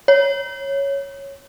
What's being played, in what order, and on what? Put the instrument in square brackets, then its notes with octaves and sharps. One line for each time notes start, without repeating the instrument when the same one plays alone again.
[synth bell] C#5